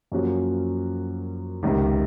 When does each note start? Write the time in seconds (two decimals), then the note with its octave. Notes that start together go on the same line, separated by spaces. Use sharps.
0.12 F#2 F3 A#3 C#4 F#4
1.63 C#2 C3 D#3